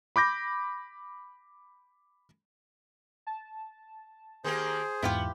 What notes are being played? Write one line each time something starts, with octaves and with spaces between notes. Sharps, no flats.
B5 D6 G6 A#6
A5
D#3 A#3 G4 G#4 C5
E2 G#2 B3 E4 F4 G4